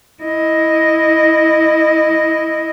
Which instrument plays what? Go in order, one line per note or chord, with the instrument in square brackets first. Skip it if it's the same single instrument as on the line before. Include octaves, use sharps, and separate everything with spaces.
[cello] E4 D#5